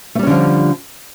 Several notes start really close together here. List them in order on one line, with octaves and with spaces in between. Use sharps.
A3 G3 C#4 D3 F3